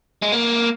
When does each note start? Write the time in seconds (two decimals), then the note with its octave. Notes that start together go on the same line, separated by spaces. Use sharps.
0.22 G#3
0.32 A#3